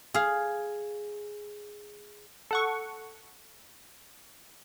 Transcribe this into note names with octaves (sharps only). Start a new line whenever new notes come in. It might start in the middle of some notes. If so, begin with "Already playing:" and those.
G#4 F5
A4 F#5 C#6